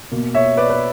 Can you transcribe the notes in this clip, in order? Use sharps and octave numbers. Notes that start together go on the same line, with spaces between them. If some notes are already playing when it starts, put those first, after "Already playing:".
B2 A#3
C#5 E5
B4 D5
B4